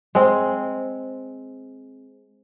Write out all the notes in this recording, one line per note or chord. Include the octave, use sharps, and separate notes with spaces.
G#3 C4